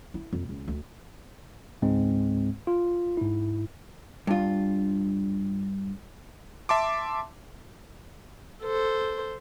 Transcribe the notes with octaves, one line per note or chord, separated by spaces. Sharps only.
E4
F2
C#2
D2
C#2 G#2 G#3 C4
F4
G#2 E4
G2 F4
E5 A5 C6 D6
A4 C5